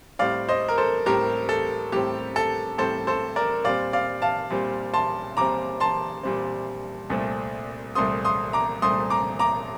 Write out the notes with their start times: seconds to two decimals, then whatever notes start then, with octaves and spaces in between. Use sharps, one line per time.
0.19 A2 G3 C4 D5 F5
0.49 C5 D#5
0.68 A#4
0.78 A4 C5
1.06 A2 G3 C4 G4 A#4
1.49 A4
1.92 A2 G3 C4 G4
2.36 A4
2.78 A2 G3 C4 A4 C5
3.07 A4 C5
3.36 A#4 D5
3.64 A#2 G3 C4 D5 F5
3.93 D5 F5
4.22 F5 A5
4.51 A#2 G3 C4
4.94 A5 C6
5.37 A#2 G3 C4 A#5 D6
5.80 A5 C6
6.23 A#2 G3 C4
7.10 C2 A#2 A3 C4
7.95 C2 A#2 A3 C4 C6 D#6
8.25 C6 D#6
8.53 A#5 D6
8.82 C2 A#2 A3 C4 C6 D#6
9.10 A#5 D6
9.39 A#5 D6